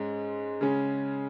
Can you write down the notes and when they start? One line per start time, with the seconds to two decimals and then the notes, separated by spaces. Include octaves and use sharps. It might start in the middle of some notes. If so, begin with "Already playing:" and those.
Already playing: G#2 G#3 C#4
0.61 C#3 G#3 C#4